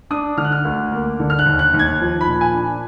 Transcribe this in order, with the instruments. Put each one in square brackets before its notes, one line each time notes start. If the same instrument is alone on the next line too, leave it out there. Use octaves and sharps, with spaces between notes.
[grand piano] D4 D#6
D3 F6
F#6
F6
D2
A#3
D3
F6
F#6
D#2
F#6
D#2
G#6
F3
B5
A#2
G#5
D4